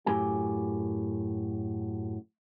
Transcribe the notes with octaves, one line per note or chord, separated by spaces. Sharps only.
F#2 A2 G4 G#5